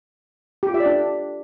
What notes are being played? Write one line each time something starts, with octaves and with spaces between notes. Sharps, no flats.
G4
F4
E5
D5
D4